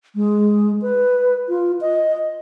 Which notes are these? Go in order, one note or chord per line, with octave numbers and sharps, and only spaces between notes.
G#3
B4
F4
D#5